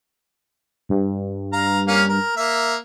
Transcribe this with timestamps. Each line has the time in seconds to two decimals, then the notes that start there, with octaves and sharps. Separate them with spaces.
0.89 G2
1.53 F5 A#5
1.88 A#3 C#4 F5
2.09 A#4
2.37 A#3 E5